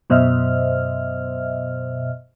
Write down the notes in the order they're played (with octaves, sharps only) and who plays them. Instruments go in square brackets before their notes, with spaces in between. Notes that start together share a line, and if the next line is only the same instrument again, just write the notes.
[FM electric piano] F#2 B2 C5 D#5 E5 F6